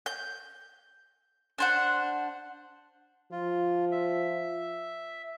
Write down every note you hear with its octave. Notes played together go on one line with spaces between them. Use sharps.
G6
D4 C5 F#5
F3 F4
E5